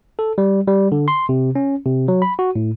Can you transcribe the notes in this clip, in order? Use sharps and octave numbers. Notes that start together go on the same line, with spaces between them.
A4
G3
G3
D3
C6
C3
C#4
C3
F#3
B5
F#4
A2